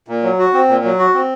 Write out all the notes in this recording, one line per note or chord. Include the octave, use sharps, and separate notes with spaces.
A#2
F#3
F#4
C4
A#2
F#3
F#4
C4